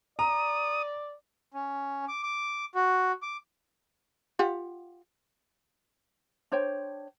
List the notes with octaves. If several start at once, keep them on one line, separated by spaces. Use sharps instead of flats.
D5 A#5 D#6
C#4
D6
D6
F#4
D6
F4 G4 F#5
D4 C5 C#5 G5